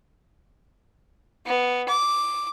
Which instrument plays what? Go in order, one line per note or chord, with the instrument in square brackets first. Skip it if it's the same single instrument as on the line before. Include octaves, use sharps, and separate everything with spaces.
[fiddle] B3
D6